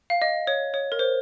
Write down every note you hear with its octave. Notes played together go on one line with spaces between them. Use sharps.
F5
D#5
C#5
C#5
A#4
C5